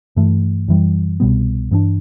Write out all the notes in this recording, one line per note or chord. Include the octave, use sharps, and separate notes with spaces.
G2 E3 A3
F#2 E3 G3
C2 B2 G3 B3
G2 E3 B3 D4